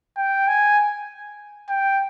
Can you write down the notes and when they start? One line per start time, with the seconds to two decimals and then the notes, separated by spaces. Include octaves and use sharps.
0.17 G5
0.48 G#5
1.69 G5